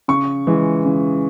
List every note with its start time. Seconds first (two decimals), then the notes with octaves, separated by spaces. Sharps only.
0.08 C#3 C#6
0.47 E3 G#3
0.85 C#3